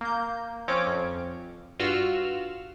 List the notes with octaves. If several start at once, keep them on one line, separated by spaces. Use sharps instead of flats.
A#3 G6
F3 C4 C#4 C#5 D6 D7
F2
G2 F4 F#4 E6 F6